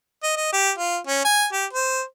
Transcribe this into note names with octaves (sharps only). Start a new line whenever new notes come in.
D#5
D#5
G4
F4
C#4
G#5
G4
C5